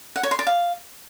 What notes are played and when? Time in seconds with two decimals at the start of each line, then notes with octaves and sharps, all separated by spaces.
0.16 F#5
0.23 C#5
0.31 C6
0.39 D5
0.47 F5